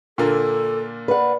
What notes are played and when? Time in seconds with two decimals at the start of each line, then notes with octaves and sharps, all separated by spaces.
0.18 A#2 D3 A#3 A4
1.08 B4 D5 F#5